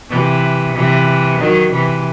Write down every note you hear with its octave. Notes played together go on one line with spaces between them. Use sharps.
C3 E3
C3 E3
D#3 F#3
C3 E3